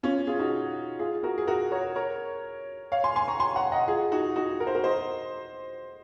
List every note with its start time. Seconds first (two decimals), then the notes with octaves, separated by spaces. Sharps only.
0.03 C#4 F4
0.27 F4 G#4
0.39 D#4 F#4
0.99 F4 G#4
1.23 F#4 A#4
1.38 G#4
1.47 F#4 A#4
1.72 A#4 C#5
1.96 A#4 C#5
2.92 C#5 F5
3.04 G#5 C6
3.16 G#5 C6
3.28 A#5 C#6
3.40 G#5 C6
3.56 F#5 A#5
3.72 D#5 F#5
3.88 F4 G#4
4.12 D#4 F#4
4.36 D#4 F#4
4.60 A#4
4.67 C5
4.75 F#4 A#4
4.84 C5 D#5